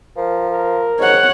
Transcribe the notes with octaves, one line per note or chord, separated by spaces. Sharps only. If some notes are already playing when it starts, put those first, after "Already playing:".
F3 A#4
A#4
G#2 C#5 F#5